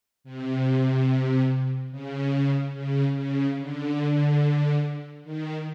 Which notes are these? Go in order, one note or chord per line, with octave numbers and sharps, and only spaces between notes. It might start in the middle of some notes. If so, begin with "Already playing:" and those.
C3
C#3
C#3
C#3
D3
D#3